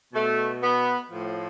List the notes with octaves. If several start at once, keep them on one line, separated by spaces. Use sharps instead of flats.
B2 A3
B3
A2 F3